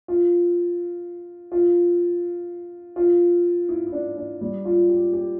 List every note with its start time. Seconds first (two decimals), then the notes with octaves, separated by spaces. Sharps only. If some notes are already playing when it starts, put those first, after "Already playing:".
0.08 F4
1.52 F4
2.96 F4
3.69 E4
3.87 E4
3.92 D4
4.17 D4
4.41 G3
4.65 F4
4.89 G4
5.13 G4